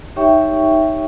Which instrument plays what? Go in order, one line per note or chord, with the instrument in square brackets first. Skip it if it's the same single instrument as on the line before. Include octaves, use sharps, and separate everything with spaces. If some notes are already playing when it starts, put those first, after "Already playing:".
[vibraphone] D#4 G4 C#5 E5 G5 C#6